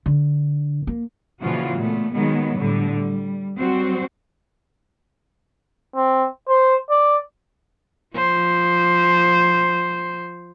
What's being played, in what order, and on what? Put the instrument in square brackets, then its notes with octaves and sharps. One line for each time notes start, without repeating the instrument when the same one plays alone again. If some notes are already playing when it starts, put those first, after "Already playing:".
[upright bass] D3
A#3
[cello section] A#2 C#3 E3 F3 F4 F#4
A#2 A3 B3
B2 D#3 F#3 G#3 B3
A2 D3 G3
G3
F#3 G3 C4 F#4 C5
[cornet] C4
C5
D5
[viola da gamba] F3 C5